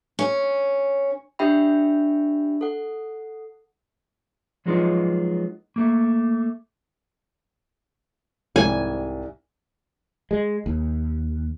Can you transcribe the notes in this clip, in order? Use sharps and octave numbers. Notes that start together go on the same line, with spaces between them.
C#4
D4 G4 E5 G5 B5
A4 F#5
F3 F#3 G#3 B3 D#4 F4
A3 A#3
C2 G#2 G3 G#5
G#3
D#2